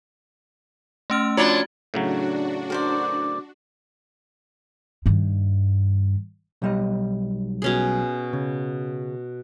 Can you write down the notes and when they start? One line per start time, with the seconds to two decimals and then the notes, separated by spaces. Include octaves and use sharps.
1.10 A3 C#4 F6
1.37 F3 D4 F4 F#4 C#5
1.94 A2 C#3 F#3 D4 F#4
2.70 A#4 C5 D5
5.06 G2 D#3
6.62 B1 G3 D#5
7.62 B2 C#4 G#4
8.33 C#3